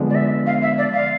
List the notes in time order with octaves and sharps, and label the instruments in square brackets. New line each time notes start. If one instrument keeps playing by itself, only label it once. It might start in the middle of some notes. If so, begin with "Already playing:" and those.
Already playing: [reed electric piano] D3 F3 G#3 B3 D4
[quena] D5
E5
F5
E5
D5
F5